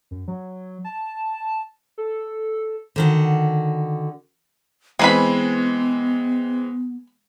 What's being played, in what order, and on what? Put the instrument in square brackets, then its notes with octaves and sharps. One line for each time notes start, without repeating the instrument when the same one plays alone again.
[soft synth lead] F#2
F#3
A5
A4
[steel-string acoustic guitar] D3 D#3 F#4
[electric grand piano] E3 G#3 C4 [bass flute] B3 [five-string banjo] G#4 B4 B5